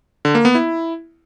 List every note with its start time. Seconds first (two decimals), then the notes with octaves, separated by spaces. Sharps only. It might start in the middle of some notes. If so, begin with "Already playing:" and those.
0.25 D3
0.35 A#3
0.45 B3
0.55 E4